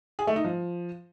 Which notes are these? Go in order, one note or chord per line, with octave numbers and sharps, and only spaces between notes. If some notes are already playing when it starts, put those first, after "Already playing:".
G#4
A3
D#4
F3